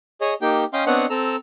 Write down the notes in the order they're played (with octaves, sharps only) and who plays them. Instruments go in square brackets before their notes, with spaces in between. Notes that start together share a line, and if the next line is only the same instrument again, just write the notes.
[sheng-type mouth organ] G#4 C#5 D#5
A#3 D#4 G4 G5
C#4 D#5 F5 G5 C6
B3 C4 D4 C#5 D#5 F#5
C4 A4 A#5 E6